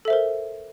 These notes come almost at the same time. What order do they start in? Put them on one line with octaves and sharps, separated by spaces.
A4 E5 C5 A#4